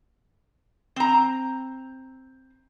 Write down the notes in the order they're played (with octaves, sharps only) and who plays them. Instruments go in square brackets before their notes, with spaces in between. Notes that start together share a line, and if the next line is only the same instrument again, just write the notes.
[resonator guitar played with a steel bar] C4 A#5